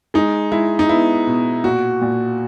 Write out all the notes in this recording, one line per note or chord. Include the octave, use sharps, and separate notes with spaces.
G#3 D#4
G#3 E4
D#4
B3 E4
B2
A#2 F#4
A#2